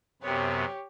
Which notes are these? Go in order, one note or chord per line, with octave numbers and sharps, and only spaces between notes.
F#2 C3 B3 G4 C#5